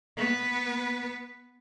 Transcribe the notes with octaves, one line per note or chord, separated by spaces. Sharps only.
B3 B4